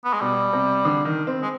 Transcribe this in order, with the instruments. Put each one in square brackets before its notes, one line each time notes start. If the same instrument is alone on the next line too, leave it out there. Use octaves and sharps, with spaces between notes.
[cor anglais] B3
G#3
[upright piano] B2 [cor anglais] G3
[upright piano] C3
D3
D#3
C4
[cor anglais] G#3